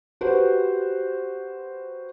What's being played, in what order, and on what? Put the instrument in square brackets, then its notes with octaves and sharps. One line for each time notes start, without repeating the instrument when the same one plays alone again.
[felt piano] F#4 G4 B4 C5